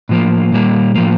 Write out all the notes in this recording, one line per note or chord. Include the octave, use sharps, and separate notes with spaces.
A2 F3 A#3
A#2 G3 A#3
A2 F3 A#3